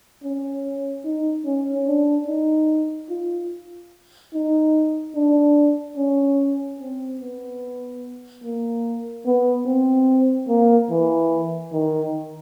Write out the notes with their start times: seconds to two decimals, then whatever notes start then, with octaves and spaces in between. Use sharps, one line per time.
0.23 C#4
1.05 D#4
1.45 C#4
1.88 D4
2.28 D#4
3.10 F4
4.34 D#4
5.15 D4
5.97 C#4
6.80 C4
7.21 B3
8.44 A#3
9.26 B3
9.67 C4
10.49 A#3
10.91 E3
11.73 D#3